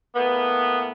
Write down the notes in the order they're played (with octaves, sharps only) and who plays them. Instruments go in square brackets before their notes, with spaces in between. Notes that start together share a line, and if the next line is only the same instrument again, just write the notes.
[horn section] A2 A#3 B3